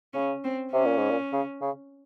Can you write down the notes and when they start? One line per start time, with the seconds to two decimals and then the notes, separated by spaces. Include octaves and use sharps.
0.13 C#3 C#4
0.44 C4
0.72 C3 C#4
0.85 A#2
0.98 G#2
1.10 A#2
1.33 C#3
1.61 C#3